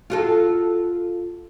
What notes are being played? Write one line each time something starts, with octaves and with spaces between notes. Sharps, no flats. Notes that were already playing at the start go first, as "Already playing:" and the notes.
F4 F#4 A4